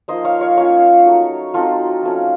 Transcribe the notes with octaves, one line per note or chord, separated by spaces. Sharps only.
F3 A#3 D#4 C5 D#5
C#5 F5
C#5 F5
A#3 C#4 F4 C#5 F5
F#3 A3 D#4
F#3 C4 D#4 F4 A4
F3 A3 C#4